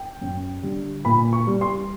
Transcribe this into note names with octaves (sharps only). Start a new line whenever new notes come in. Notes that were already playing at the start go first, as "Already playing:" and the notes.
Already playing: G5
F#2
D3 G3
A#2 B5
C#6
G3
C6